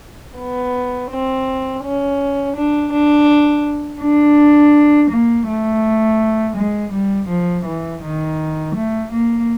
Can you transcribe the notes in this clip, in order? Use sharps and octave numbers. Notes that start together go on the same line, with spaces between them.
B3
C4
C#4
D4
D4
D4
A#3
A3
G#3
G3
F3
E3
D#3
A3
A#3